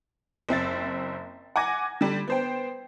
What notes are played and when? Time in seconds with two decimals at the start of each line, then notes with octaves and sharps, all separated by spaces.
0.49 F#1 C4 E5 A6
1.56 F#5 G#5 D6 G#6 A#6
2.01 D3 G3
2.28 B3 C5 G5